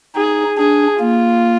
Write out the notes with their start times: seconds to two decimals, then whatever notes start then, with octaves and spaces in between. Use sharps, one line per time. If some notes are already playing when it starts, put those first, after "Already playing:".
0.15 D#4 G#4
0.57 D4 G#4
0.99 A#3 F4